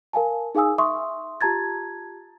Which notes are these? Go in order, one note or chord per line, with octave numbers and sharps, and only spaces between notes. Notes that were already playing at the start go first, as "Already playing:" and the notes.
A#4 F5 G#5 A5
D#4 G#4 F5 G#5 D#6 E6
E5 C6 C#6 D#6
F4 G4 A5 A#5 G#6 A6